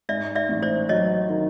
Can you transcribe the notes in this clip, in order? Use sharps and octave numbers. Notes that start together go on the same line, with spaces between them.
G#2 D5 E5
D5 E5
A1
C5 D5
F#3 C#5 D#5
D#3